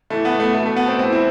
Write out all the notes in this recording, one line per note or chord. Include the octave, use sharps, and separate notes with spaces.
A2 E3 A3
B3
A3
B2 A3
A3
B3
C4
A2 E3 C4
E4